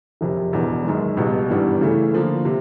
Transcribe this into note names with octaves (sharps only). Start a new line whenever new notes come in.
F#1 F2 C3
E1 E2 B2
F#2 D#3 G#3
C#2 B2 G3 B3
G#1 G2 E3 G3 B3
C#3 E3 A3
D3 F3 A#3
C3